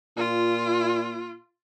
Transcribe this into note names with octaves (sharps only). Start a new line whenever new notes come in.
A#2 F4